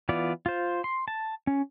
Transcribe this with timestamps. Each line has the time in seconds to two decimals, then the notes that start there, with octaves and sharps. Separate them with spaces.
0.09 E3 B3 F4 D5
0.46 F4 C5
0.84 C6
1.08 A5
1.47 C#4